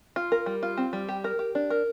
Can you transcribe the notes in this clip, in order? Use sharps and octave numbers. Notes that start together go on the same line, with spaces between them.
F4
A#4
G3
F4
C4
G3
G4
A#4
G4
D4
A#4